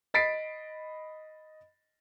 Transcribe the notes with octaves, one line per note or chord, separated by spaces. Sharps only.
D#5 B5 A6 B6 C7 D7